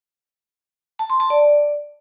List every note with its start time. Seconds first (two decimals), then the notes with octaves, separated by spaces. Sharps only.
0.99 A5
1.10 C6
1.20 A5
1.30 D5